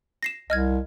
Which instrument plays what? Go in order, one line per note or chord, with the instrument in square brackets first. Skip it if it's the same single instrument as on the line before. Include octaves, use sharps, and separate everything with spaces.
[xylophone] A#6 C7 E7
[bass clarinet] C2 [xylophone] D#5 F6 G#6